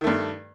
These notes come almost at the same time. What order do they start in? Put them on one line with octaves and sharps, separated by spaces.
D#3 A3 G2